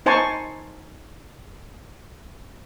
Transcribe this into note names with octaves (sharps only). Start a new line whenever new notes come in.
D#4 C5 G#5 A5 C6 C#6